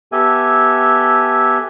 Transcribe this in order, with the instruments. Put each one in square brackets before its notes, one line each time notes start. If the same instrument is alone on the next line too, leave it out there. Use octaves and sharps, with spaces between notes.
[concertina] B3 G4 A4 E5 G#5